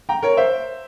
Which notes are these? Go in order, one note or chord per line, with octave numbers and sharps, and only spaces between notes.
G5 A#5
A#4 C#5
C5 E5